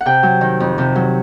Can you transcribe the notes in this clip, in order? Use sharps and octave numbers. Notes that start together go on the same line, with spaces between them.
F#5
C3 G5
F#3
D#3
F2
C3
F#3